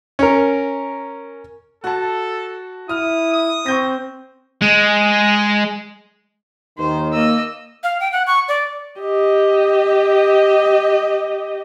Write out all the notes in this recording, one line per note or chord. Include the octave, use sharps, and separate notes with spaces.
C#4 A#4
F#4 A4 A5
E4 D#6 F6
D#6
C4 C#6 G6 A#6
G#3
D#2 D#3 C5
A#3 D#5 E6
F5
G5
F#5
C#6
D5
G4 D#5